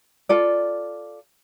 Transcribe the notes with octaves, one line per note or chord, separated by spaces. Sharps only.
F4 A4 D5